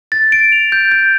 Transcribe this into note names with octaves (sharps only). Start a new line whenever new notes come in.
A6
D7
F7
G6
G6